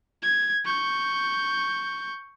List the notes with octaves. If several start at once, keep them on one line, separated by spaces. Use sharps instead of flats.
G#6
C#6 G6